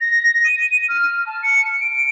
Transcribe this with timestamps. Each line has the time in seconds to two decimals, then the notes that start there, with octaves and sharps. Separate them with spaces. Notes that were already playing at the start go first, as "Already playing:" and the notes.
0.01 A#6
0.45 D#7
0.89 F6
1.27 A5
1.43 C#7
1.81 D7